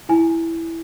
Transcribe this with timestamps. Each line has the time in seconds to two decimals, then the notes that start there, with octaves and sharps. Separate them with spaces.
0.09 E4 G#5